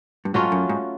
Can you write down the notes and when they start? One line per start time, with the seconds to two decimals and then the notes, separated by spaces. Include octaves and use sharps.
0.25 G2
0.34 G#2 F#3 A3 C#4 F4
0.52 F#2
0.69 G#2